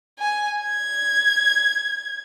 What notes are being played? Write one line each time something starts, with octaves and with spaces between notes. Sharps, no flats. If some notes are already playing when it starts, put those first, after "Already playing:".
G#5
G#6